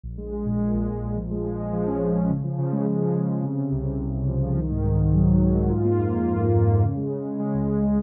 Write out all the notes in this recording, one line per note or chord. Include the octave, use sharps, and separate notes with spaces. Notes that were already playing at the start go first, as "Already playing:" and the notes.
A#1
G#3
G#3
A#2
G#3
A#1
A#1
A#1
F3
G#3
G#3
G#3
F3
C#4
C#4
C#4
C#3
F3
C#3
G#3
C#3
C#3
C#3
C#3
C3
C3
C2
C2
C2
C2
F3
C2
D#3
G#2
G#2
G#2
F#3
F#3
F#3
G#2
F4
A#3
F2
F4
F2
A#3
F2
A#3
C#3
G#3
G#3
C#3
G#3
C#2
C#2
G#3